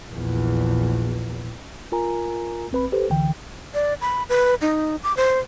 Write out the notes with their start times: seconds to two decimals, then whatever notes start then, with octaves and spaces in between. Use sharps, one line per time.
0.10 A#1 E2
1.92 F4 A#4 G#5 A#5
2.71 A#1 C4 B4 B5
2.92 G4 A4 B4 C5
3.10 C#2 D3 E3 G5
3.74 D5
4.01 B5
4.29 B4
4.61 D#4
5.03 D6
5.17 C5